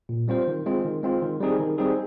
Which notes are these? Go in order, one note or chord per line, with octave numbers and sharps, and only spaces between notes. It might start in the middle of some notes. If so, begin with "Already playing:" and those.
A#2
G3 C4 F4 C5
D#3
G#3 C4 F4
D#3
G#3 C4 F4
D#3
G3 C4 D#4 G#4
D#3
G3 C4 D#4 G#4